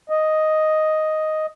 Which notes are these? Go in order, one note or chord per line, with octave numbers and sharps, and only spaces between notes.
D#5